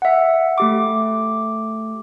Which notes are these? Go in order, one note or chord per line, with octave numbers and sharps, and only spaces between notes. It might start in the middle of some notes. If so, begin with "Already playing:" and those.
E5 F#5
A3 G4 D6